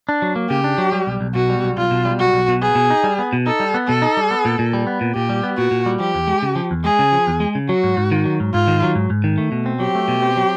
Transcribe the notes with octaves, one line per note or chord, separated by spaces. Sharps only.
D4
F#3
A#3
C#3 G4
D4
F#3
G3
B1
B1
B2 F#4
G3
B1
B1 F4
B2
G3
B1 F#4
B1
B2
B3 G#4
B2
D#4
G3
B3
B2
D#4 A4
G3
B3
B2 A4
D#4
G3
B3
A#2
A#2
G3
B3
A#2
A#2 G4
G3
B3
A#2 F#4
A#2
G3
F3 G4
E2
G#3
C#3
F3
E2
G#3 G#4
C#3
F3
E2
G#3
C#3
F#3 F#4
G#2
G#2
D#3
F#3
G#2
G#2 F4
D#3
F#3
G#2
G#2
D#3
A3
B2
C4
F#3 G4
A3
B2
C4
F#3